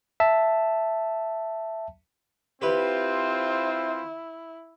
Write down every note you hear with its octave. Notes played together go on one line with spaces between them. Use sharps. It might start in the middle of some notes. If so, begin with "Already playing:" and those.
E5 A5
C4 E4 F4 G4 B4 C5